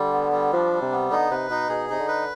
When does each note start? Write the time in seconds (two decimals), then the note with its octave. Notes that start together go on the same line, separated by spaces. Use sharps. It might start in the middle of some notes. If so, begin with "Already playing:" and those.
Already playing: D3 G3
0.13 B3
0.32 G3
0.52 F3 D4
0.72 G3
0.82 C3
0.92 B3
1.11 D3 D#4
1.31 C3 B4
1.50 B2 D#4
1.69 B2 G#4
1.90 C3 D#4
1.99 D3
2.08 B4